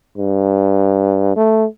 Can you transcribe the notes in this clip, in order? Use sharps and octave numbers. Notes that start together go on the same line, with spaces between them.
G2
A3